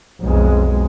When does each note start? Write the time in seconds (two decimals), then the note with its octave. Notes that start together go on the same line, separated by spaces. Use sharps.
0.21 B1 F2 G#3